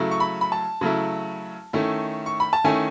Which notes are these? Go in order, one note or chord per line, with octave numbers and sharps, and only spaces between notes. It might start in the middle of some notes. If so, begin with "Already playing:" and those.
Already playing: C#3 F#3 A3 E4
C#6
B5
B5
A5
C#3 F#3 A3 E4
D#3 A3 C#4 E4
C#6
B5
A5
D#3 A3 C#4 E4 G#5